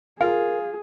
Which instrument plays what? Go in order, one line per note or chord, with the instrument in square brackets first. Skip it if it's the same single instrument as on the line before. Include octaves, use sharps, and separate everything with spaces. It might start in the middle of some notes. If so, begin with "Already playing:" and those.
[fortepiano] F4 [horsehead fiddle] G#4 [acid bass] A#4